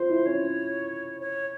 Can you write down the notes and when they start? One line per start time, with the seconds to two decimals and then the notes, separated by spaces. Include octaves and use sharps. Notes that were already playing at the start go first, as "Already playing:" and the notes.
Already playing: F4 C5
0.09 E4
0.25 C#4 C#5
1.20 C#5